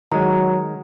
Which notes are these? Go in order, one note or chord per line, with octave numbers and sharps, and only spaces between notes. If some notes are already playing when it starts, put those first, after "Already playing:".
D#3 F#3 G#3 A#5